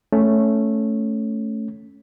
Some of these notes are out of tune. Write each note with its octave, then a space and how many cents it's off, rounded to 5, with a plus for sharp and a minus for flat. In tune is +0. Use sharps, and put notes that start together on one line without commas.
A3 +0 C#4 +0